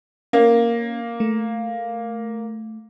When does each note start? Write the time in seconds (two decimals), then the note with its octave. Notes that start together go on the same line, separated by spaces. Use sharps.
0.33 A#3 C#4
1.20 A3